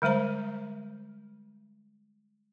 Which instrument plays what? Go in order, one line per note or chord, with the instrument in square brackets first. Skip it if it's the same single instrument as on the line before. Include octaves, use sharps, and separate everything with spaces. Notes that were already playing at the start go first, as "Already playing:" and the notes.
[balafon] D3 G3 G#3 C5 A#5